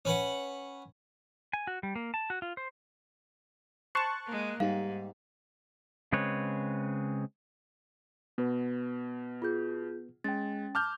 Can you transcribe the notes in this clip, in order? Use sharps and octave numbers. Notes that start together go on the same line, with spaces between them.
C#4 B4 F#5
G#5
F#4
G3
A#3
A5
F#4
F4
C5
C5 A5 C#6 F#6 C7 E7
G#3 A#3
G#2 G3 D#4 G4 F5
C#3 G#3 C4 B4 C#5
B2 B3 B4
F4 G#4 G6
G#3 C#4 G5 A6
A5 D6 F6 G6